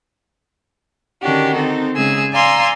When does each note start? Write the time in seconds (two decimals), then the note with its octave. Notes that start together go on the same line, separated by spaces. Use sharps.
1.21 D3 D#3 C#4 D4 F#4 G4
1.55 C4 D#4 A4
1.95 C#3 G#3 G#4 G#5 E6
2.33 D5 F5 G#5 A#5 C6 E6